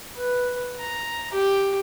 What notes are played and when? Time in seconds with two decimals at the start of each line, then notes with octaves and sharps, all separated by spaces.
0.16 B4
0.80 A#5
1.33 G4